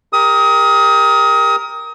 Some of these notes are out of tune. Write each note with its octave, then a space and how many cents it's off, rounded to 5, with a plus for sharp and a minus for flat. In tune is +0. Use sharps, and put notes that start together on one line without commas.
G4 +25 A#4 +0 D#6 +25